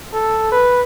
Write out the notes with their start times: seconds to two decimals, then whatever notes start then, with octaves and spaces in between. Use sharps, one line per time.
0.13 A4
0.52 B4